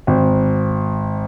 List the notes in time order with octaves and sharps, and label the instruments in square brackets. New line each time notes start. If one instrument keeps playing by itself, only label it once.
[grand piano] G#1